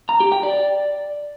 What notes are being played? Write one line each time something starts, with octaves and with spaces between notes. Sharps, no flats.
A#5
G4
G5
D5